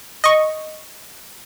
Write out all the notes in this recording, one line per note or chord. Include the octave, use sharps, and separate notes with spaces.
D#5 C#6